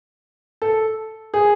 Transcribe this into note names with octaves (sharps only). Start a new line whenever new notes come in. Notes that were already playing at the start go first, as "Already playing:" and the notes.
A4
G#4